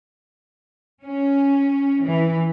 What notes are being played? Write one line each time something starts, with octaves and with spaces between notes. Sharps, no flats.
C#4
E3